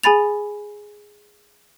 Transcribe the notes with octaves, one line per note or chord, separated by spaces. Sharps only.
G#4 G#5 B5 A6 F7